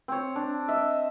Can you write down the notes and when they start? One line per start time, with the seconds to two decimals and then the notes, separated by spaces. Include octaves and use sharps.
0.08 C4 C#5
0.36 D4
0.68 D#5 E5